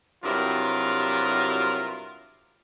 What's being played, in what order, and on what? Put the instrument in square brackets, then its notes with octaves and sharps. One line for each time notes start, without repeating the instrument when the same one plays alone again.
[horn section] G2 C3 F#3 E4 F4 A#4